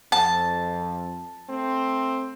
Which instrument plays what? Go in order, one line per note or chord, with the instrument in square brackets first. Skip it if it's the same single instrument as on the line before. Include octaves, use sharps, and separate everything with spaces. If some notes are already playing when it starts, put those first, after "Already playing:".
[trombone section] F2 [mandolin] A5
[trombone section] A3 C4